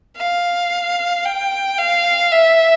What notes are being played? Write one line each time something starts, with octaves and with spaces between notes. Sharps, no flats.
F5
G5
F5
E5